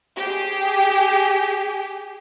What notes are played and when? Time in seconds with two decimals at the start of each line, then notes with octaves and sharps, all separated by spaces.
0.16 G4 G#4